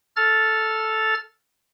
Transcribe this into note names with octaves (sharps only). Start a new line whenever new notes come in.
A4 F6 A6